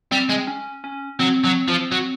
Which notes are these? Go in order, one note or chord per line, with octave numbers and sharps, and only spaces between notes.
G3 C4
G#3
C#4
C#4
F#3 C4
F#3
F3
F#3